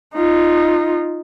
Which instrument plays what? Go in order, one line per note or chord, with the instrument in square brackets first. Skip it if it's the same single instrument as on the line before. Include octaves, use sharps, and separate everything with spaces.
[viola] D#4 F4